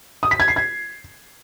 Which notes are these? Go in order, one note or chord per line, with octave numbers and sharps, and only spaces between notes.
D#6
B6
G#6
C7
G#6